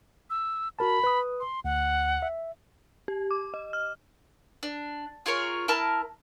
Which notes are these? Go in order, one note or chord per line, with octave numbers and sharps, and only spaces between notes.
E6
F#4 A#4 A5 B5
B4 D#6
C6
D2 F#5
E5
G4
D6
D#5
F6
D4
F4 G#4 A#4 C#5
E4 A#4 A5 F6